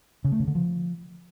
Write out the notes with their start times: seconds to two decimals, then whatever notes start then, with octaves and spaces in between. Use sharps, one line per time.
0.24 C#3
0.32 A3
0.40 C#3
0.47 D3
0.55 F3